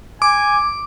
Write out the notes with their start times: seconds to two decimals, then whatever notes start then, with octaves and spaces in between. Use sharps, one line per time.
0.22 G#5 D6